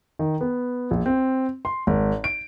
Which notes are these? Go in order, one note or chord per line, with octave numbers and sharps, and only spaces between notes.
D#3
B3
A#1
C4
C6
G#1
D7